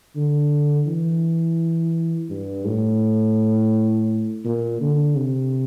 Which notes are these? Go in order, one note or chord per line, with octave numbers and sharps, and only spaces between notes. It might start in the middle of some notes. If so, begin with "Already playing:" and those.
D3
E3
G2
A2
A#2
D3
C3